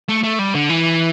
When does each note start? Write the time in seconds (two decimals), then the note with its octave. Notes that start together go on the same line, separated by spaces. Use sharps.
0.08 A3
0.23 A3
0.39 G3
0.54 D3
0.70 E3